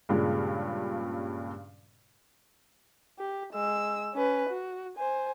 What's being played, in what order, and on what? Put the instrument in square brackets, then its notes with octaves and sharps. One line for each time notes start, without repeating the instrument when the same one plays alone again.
[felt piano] G2 A#2 C#3 G#3
[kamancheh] G4
G#3 E6
C#4 B4
F#4
C5 G#5